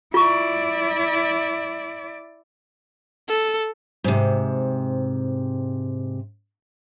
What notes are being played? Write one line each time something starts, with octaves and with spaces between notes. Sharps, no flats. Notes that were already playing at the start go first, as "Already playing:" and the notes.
E4 F4 D5 C#6
A4
G#2 C3